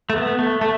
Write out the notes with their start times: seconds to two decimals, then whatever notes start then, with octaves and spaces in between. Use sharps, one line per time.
0.10 A3
0.16 B3
0.39 A3
0.61 A3